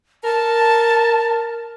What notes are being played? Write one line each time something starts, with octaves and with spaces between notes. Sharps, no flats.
A#4 A5